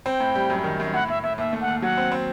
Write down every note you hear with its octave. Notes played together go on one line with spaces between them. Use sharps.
C4 G5
A2
G3
F#2
D#3
F#2
A2 F#5
A2 E5
A2 E5
D#2 E5
A3
F#5
D#2
F#3 F#5
C4
C4